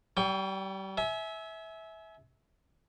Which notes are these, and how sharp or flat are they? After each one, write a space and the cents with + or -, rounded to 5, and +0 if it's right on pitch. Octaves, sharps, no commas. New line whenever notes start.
G3 -30 G5 +20 C#6 +40
E5 -15 G#5 +30